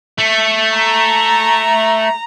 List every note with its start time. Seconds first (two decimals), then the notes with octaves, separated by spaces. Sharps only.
0.18 A3
0.75 A#5